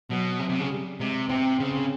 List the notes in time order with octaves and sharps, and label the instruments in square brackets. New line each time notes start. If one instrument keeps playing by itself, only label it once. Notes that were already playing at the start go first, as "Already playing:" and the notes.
[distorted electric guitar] B2 [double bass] F#3
[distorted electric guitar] C3 [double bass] F#3
[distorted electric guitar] C3
C#3
[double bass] G3
[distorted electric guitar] C3 [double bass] G#3
[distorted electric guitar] C3 [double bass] C4
[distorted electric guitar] C#3 [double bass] C4